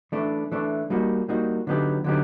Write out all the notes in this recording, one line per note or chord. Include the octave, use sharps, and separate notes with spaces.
E3 A3 D4
E3 A3 D4
G3 A#3 D#4 F#4
G3 A#3 D#4 F#4
D3 F#3 B3 D#4 G4
D3 F#3 B3 D#4 G4